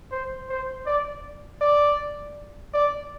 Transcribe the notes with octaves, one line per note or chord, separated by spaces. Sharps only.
C5
C5
D5
D5
D5